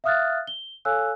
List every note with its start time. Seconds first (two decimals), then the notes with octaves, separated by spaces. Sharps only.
0.04 E5 F5 D#6 F6 F#6 A6
0.47 G7
0.85 A4 C#5 F5 G#5 E6 F#6